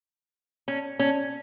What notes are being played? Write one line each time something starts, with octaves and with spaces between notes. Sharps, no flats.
C#4
C#4